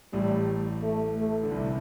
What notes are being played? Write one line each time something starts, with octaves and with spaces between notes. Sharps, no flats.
A1 A2 G3
A3
A3
D3
C2 C3